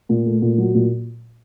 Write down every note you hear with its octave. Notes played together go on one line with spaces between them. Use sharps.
A#2
A3
A#2
F#3
A#2